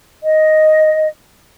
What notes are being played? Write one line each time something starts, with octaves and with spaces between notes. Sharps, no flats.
D#5